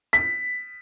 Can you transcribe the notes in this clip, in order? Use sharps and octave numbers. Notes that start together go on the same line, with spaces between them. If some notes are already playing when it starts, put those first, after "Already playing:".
B6